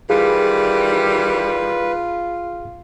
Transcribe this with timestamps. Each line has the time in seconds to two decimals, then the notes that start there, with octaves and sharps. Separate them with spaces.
0.10 D#3 E3 G3 F4 G#4 B4